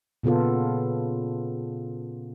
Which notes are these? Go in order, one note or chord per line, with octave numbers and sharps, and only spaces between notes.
A#2 C#3 B3 F4 A4